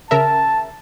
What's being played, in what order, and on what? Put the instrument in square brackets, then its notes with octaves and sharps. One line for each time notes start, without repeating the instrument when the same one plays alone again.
[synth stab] C#3 A#4 E5 [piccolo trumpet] A5